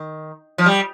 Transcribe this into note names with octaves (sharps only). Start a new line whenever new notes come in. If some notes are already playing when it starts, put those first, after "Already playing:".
Already playing: D#3
F3
G3